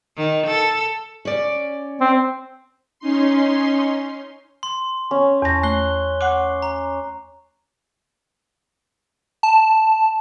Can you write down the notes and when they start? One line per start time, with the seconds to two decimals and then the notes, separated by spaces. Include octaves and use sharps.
0.17 D#3
0.47 A4
1.25 C#4 D5
2.01 C4
2.99 C#4 D#4 C6
4.63 C6
5.11 C#4
5.42 E2 A5 A#6
5.63 A3 F#6 G7
6.21 F#5 D6 F#6 C7
6.62 A#5
9.43 A5